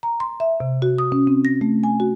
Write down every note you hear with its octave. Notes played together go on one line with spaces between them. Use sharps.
A#5
C6
E5
C3
F#4
D#6
C#4
C4
A#6
A3
G#5
F#4